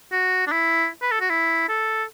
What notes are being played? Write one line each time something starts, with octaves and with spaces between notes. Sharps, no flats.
F#4
D4
E4
B4
A4
F#4
E4
A4